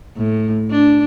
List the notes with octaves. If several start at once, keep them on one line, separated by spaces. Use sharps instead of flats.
A2
D4